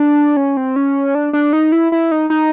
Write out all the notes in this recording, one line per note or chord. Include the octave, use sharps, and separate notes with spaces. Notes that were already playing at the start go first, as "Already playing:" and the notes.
Already playing: D4
C#4
C4
C#4
D4
D4
D#4
E4
E4
D#4
D#4